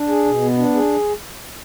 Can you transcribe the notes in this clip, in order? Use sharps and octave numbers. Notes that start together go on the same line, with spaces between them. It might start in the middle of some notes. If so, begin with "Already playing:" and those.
Already playing: D4
G#4
B2
B3
D4
G#4